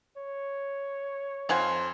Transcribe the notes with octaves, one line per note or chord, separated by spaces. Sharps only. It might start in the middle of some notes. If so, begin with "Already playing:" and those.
C#5
F2 C5 F5 F#5 G#5 C6